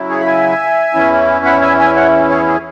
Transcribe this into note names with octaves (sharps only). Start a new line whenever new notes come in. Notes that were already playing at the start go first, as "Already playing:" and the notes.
Already playing: C#3 F#3 E4
G#4 C#5
B5
E5 G#5
E2 E3 C#4 E4
F#5 B5
E5 G#5
E5 G#5
C#5 F#5
G#4 C#5
G#4